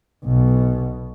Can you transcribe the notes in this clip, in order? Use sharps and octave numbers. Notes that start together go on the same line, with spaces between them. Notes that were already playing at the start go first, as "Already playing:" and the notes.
B1 B2